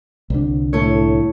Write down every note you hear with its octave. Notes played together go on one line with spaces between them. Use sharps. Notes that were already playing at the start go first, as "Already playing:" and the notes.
C2 D3
A2 A3 C#5